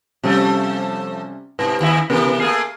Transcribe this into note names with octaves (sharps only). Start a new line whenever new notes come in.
C3 F3 G3 A3 C#4
G#2 C3 B4
D#2 E4 E5
C3 E3 B3 G4 A#4
A3 A#3 G#4 F6 C7